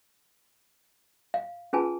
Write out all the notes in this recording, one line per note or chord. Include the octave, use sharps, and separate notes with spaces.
F5
C#4 F4 G#4 B4 G#5 A5